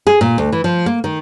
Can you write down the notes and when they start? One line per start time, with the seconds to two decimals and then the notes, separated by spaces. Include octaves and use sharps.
0.07 G#4
0.21 A#2
0.38 D2
0.52 E3
0.64 F3
0.86 A#3
1.04 D#3